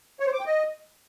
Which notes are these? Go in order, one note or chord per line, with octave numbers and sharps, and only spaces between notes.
C#5
C5
D6
G5
D#5